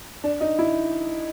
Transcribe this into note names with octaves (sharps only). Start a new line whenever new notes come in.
D4
D#4
E4